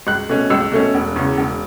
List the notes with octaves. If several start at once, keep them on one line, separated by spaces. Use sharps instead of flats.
C#2 F#6
B2 A3 C#4
C#2 E6
B2 A3 C#4
E1
E2 C#3
E1